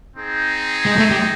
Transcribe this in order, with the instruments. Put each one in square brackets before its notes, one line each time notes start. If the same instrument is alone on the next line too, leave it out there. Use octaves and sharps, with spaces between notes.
[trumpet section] C4 D#4 G#4
[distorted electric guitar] G#3
A3
G3